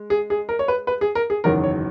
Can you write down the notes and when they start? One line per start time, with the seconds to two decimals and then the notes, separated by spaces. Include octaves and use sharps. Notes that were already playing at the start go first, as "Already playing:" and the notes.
Already playing: G#3
0.10 G#4
0.30 G#4
0.49 A#4
0.59 C#5
0.68 B4
0.87 B4
1.01 G#4
1.15 A#4
1.30 G#4
1.44 F#1 E2 D#3 F#3 A#4
1.63 C#5